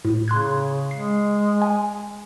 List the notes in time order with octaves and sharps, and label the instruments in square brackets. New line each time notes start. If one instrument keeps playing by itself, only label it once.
[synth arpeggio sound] A2
[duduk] C#3 [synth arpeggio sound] C6 F#6 G#6
[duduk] G#3 [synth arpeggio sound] C7
[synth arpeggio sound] G#5